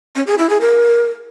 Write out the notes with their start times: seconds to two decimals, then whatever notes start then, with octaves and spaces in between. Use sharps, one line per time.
0.16 C#4
0.27 G#4
0.38 E4
0.50 G#4
0.61 A#4